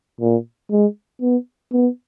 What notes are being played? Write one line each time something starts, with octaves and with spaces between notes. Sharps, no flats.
A#2
G#3
B3
B3